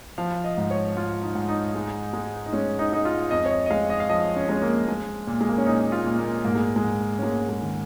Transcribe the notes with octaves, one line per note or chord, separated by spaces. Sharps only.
F3 F5
D#5
G#2
C#5
G#2 F4
D#4
G#2
D#4
G#3
G#3
D#4
G#3 C#4
D#4
G#3 D#4
F4
F2 D#5
C#5
D#5
D#5
G#3 F5
D#5
F5
F3 D#5
C#4
G#3 C#4
A#3
G#3
A#2
G#3
A#3
C#4
A#2 D#4
F4
A#2
A#3
G#2 A#3
G#3
G#3
G#2
C#4
G#3 A#3
G#3
D#3